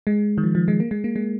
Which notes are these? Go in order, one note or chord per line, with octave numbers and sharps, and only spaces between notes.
G#3
D#3
F3
F3
G#3
A#3
G#3
A#3
G#3